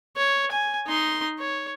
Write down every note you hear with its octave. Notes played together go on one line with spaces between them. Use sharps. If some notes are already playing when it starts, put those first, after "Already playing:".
C#5
G#5
D#4 C6
C#5